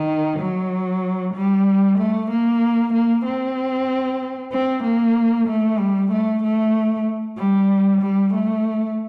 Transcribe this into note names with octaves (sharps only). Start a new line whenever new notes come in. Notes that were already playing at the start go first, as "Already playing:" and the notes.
Already playing: D#3
F#3
G3
A3
A#3
A#3
C4
C4
A#3
A3
G3
A3
A3
G3
G3
A3